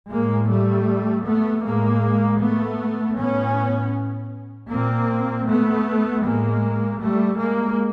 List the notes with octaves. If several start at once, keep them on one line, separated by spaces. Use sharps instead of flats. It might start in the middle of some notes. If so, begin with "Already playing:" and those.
A2 G#3 A#3
G3 A3
A3 B3
A2 G#3 A#3
A3 B3
A2 B3 C#4
A#2 A#3 C4
A3 B3
A2 G#3 A#3
G3 A3
G#3 A#3